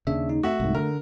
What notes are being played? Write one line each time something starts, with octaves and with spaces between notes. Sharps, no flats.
D#2 C#3 D4 E5
D#4
A3 F#4 E5
C2 G#2
D3 A#4